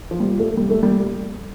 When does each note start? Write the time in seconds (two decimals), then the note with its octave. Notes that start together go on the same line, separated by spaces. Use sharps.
0.11 F3
0.20 G3
0.39 A3
0.57 G3
0.70 A3
0.83 G3